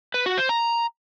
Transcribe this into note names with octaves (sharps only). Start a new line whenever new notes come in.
B4
F#4
C5
A#5